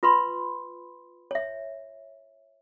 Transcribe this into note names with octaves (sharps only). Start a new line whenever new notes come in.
F4 B4 B5 C6
C#5 E5